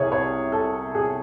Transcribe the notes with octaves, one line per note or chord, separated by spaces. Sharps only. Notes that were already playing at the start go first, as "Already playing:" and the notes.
Already playing: C2 C3 G#4 C#5
C#5
A4
G#4